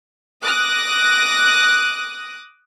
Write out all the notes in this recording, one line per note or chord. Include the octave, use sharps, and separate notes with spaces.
D6 D#6 F#6 A#6